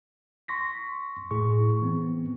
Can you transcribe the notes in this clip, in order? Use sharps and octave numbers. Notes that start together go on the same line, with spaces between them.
C6 C#6 A#6 B6
A2 G#4 C#6
E3 B3 C4